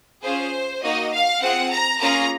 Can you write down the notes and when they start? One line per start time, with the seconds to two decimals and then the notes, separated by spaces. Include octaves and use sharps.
0.24 C#4 F4 G#4 C5
0.82 A#3 D#4 F#4 D#5
1.12 F5
1.41 C4 F4 G#4 F#5
1.71 A#5
2.00 A#3 C#4 F4 G#4 A#5